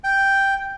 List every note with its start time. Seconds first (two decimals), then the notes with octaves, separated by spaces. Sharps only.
0.04 G5